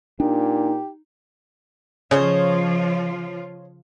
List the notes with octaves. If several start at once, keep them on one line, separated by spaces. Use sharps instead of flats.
A#2 D4 D#4 G4
C#3 F3 F4 C5 C#5 D#5